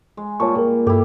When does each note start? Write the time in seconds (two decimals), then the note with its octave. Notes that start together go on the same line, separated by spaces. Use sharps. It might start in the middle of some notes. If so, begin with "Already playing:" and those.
0.17 G#3
0.40 A#2 G3 C#5 A5 C#6
0.55 F4 G#4 A#4
0.87 G2 E4 G4 A4